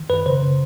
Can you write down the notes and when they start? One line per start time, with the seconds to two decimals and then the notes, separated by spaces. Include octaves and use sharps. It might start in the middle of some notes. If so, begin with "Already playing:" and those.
Already playing: D#3
0.10 F#2 B4
0.26 C#3 C5
0.43 C#3